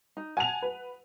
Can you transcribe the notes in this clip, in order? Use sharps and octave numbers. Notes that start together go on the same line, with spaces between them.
D#4
F#5 G#5 A5 F7
B4